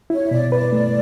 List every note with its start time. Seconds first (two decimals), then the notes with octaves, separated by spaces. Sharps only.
0.10 E4 C#5
0.26 E5
0.31 B2 D5
0.52 B4 D5
0.73 A3